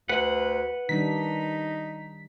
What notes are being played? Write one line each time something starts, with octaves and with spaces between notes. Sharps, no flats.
D2 B4 F#5
D#3 G3 D4 D#4 B6